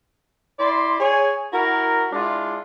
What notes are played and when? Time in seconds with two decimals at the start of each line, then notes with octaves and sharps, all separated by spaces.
0.58 E4 D5 C6
1.00 G#4 C#5 G#5
1.53 E4 F#4 A#4
2.13 G#3 D4 E4 F4